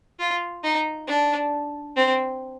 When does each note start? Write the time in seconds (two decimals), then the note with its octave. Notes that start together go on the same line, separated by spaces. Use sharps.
0.19 F4
0.63 D#4
1.07 D4
1.96 C4